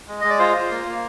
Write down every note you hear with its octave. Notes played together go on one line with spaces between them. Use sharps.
G#3
G#3 D#5
D5
F4 C5
F4
A#3
A#3